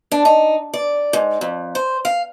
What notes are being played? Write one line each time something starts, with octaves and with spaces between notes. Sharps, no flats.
D4
D#4
D5
G#2
F2
C5
F5